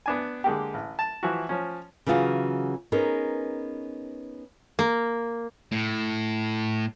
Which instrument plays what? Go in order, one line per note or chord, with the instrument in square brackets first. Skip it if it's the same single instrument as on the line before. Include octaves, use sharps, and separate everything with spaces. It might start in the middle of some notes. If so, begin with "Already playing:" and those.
[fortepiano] B3 D4 G#5
D3 G#3 A#3 G4
A1
A5
E3 F3 E4 F#4
F3 C#4
[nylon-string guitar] C#3 E3 F#3 F4 F#4 G#4
B3 C#4 D#4 G#4 A#4
[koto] A#3
[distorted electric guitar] A2